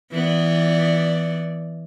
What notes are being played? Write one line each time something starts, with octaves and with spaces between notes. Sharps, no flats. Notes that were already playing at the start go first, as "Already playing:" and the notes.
E3 B3 D5